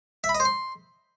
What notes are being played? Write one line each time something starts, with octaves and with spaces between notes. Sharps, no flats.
E5
B5
D#5
C5
C6